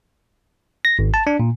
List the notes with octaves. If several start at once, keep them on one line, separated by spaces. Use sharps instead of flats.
A#6
G#1
A5
D4
A#2